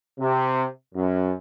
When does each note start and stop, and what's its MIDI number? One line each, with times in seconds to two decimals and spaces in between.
0.20 0.65 48
0.95 1.32 42